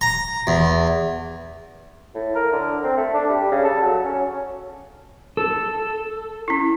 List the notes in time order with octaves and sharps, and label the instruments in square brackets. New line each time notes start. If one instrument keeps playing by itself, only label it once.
[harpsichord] A#5
E2
[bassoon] A2
A#4
D3
C4
A3
D4
G3
C#3
A4
F#3
C#4
[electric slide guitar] A4
[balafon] C#4 E4